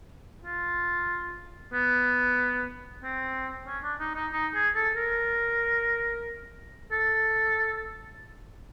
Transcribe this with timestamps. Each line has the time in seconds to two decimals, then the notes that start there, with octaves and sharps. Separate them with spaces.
0.43 F4
1.73 B3
3.02 C4
3.67 C#4
3.83 D4
3.99 D#4
4.15 D#4
4.32 D#4
4.54 G#4
4.75 A4
4.96 A#4
6.91 A4